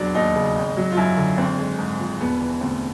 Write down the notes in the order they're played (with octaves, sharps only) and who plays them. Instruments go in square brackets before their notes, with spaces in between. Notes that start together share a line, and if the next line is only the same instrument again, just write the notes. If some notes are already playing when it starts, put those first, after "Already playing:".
Already playing: [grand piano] E1 F#3 D4
D#2 D#4
C#3
G#1
F#3
F4
F#2 E4
D3
G#1 C4
G#3
G#2
F3
E1 B3
E3
D2 C4